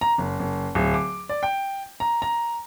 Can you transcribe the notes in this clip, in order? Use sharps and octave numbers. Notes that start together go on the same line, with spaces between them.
A#5
F#1
F#1
D1
D6
D5
G5
A#5
A#5